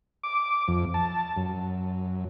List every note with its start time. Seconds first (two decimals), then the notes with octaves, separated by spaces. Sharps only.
0.24 D6
0.68 F2
0.94 A5
1.37 F#2